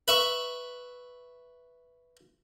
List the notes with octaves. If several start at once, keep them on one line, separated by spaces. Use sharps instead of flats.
B4 E5 C#6